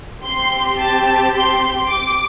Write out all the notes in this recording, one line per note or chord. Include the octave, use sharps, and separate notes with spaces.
C4 G4 C6
A5
C6
D6